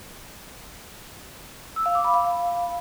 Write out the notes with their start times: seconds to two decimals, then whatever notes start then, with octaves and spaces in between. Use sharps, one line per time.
1.76 E6
1.86 F5
1.95 D6
2.05 B5
2.14 F5